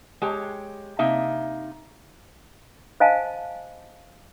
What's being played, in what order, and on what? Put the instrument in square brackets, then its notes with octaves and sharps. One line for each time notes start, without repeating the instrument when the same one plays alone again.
[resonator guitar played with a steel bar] G#3 G4 C#5
C3 A#3 D#4 E5
[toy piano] C5 D#5 F5 G#5 A5